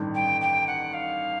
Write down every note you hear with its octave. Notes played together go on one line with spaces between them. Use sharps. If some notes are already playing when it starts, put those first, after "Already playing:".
Already playing: A1 G2 D#3
G5
G5
F#5
F5